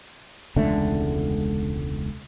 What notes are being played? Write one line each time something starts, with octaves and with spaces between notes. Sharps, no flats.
E1 C#2 D3 A3